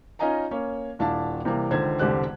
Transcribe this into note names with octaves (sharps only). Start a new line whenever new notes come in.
C#4 D#4 F4 D#5 G#5 A#5
A#3 C#4 C#5
D#1 D4 E4 F5 A5
C3 E3 G3 A#3
C#2 D3 D#3 C5 G#6
E1 C2 D3 G4 C5 F#6